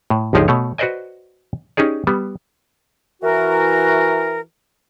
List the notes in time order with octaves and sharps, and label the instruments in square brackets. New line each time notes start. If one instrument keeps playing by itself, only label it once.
[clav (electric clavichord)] A2
G1 C#2 F3 D#4 G4 G#4
B2 A3 C#5
F#4 B4 C5 D5 D#5 G#5
C#4 D#4 G4 G#4 D5
G3 B3
[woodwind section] E3 F#4 A#4